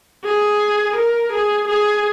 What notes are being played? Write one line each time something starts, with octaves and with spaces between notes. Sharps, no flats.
G#4
A#4
G#4
G#4